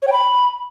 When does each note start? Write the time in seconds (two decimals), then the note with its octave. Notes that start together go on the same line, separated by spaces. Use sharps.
0.02 C#5
0.07 G5
0.12 B5